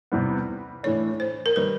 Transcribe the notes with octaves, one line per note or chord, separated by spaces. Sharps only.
E2 C3 E3 G3 B3
A2 E3 A3 D4 C#5
C5
A#4
D#3 G3 B4